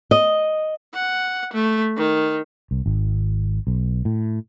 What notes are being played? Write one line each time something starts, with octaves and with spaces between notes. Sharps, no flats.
D#5
F#5
A3
D#3
C2
G#1
B1
A2